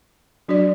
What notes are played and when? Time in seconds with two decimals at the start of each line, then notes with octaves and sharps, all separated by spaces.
0.48 F#3 D4 F#4 D5